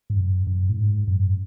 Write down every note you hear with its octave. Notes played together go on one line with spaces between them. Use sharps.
G#2
F#2
F#2
A2
G#2
F#2